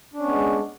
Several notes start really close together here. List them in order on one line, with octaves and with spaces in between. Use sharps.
D4 C#4 B3 G#3